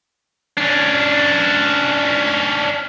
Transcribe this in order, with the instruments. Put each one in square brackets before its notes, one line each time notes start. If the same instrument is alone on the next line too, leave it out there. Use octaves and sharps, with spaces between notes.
[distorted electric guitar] C#4 D4